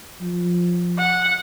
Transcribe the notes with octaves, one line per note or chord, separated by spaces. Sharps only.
F3
F#5